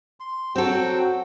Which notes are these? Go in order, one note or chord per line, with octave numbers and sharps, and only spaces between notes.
C6
F#3 C4 F#4 A4 G5